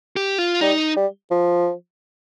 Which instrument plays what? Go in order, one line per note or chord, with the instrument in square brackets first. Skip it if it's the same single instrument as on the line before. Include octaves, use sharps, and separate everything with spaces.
[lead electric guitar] G4
F4
[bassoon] G3 [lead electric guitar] D#4
[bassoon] G3
F3